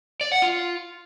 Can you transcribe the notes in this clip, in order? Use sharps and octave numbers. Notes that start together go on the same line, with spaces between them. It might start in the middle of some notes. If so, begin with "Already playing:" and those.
D5
F#5
F4